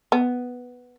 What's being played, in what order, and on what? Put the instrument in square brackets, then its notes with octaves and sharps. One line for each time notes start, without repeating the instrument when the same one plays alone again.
[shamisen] B3